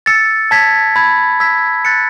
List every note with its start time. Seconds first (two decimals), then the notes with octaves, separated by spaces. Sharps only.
0.06 E6 A6 C#7
0.51 A5 G#6 B6
0.96 B5 G#6
1.40 E6 G#6 B6
1.85 F#6 A6 C#7